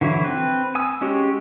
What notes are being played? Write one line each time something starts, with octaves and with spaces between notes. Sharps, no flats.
D3 E3 F#3 E4
C4 B4
G#5 D#6 E6
G#3 C#4 F#4 G4